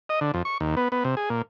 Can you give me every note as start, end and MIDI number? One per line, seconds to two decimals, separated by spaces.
0.09 0.20 75
0.21 0.31 50
0.34 0.42 41
0.45 0.58 85
0.60 0.75 39
0.77 0.88 59
0.92 1.04 59
1.04 1.15 48
1.17 1.29 68
1.30 1.42 46